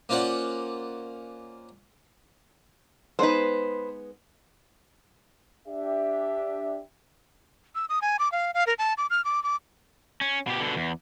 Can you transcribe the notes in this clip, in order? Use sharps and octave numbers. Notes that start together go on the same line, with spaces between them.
A#3 C#4 F4 C5 D5 F#5
G#3 B3 D#4 B4 C5
D4 G4 E5
E6
D#6
G#5
D6
F5
F5
A#4
A5
D6
F6
D6
D6
C#4
B2 G4
B2 D3
E2